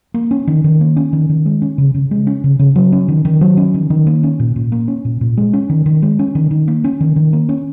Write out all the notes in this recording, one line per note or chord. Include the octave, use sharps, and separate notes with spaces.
A#3
C#4
D#3
D#3
A#3
C#4
D#3
D#3
G#3
C#4
C#3
C#3
G#3
C#4
C#3
C#3
F#3
C#4
D#3
D#3
F#3
C#4
D#3
D#3
A#3
C#4
A#2
A#2
A#3
C#4
A#2
A#2
G#3
C#4
D#3
D#3
G#3
C#4
D#3
D#3
A#3
C#4
D#3
D#3
A#3
C#4